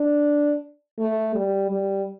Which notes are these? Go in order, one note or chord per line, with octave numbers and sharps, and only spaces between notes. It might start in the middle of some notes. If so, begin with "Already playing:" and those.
Already playing: D4
A3
G3
G3